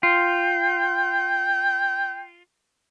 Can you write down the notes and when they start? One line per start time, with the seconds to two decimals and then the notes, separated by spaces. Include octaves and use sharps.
0.03 F4 G5